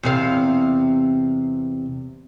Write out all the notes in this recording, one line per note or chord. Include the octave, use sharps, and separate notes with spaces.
E2 C3 F5